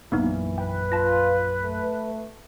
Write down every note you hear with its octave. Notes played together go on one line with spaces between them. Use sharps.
A#1 F#2 E3 A#3 B3 D#4
B4 G5
F4 A5 A#6
A3